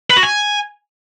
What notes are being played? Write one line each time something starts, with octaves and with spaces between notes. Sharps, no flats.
B4
F#4
G#5